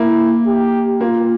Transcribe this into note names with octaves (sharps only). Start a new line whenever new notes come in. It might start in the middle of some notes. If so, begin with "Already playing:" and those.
Already playing: A#3 E4
G4
A#3 F4